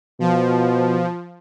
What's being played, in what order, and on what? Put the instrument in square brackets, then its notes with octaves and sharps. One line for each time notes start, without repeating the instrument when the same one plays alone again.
[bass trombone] B2 [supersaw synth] F3